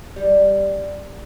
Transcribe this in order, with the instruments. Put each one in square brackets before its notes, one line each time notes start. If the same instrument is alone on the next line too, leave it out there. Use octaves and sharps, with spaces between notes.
[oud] G3